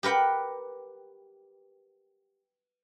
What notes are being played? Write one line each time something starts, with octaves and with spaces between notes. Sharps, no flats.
G4 A#4 B4 F#5 G5